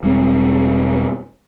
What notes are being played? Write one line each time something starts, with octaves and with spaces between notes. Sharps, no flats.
E1 G3 G#3 C4